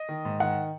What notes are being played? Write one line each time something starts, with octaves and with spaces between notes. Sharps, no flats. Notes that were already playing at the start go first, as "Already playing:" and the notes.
Already playing: D#5
D#3
G#2
D#3 F#5